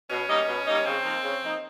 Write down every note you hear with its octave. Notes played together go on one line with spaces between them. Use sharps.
B2 C#4
G3 A#3 D#4
B2
G3 A#3 D#4
C#4
C#3 C4
F3 A#3 D#4
C#3
F3 A#3 D#4